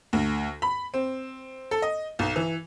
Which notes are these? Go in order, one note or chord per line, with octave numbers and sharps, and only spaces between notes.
D2
B5
C4
A4
D#5
B1
E3